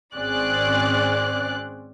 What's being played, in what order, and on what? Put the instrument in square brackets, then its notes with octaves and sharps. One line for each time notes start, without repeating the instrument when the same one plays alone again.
[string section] G#1 C4 C#4 G#4 D5 F#6